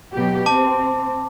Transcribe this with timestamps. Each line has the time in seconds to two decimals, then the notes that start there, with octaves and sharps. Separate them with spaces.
0.13 B2 F#3 G4
0.46 C4 A5 D6